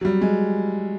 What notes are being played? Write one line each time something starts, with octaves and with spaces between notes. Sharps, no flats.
F#3
G3
G#3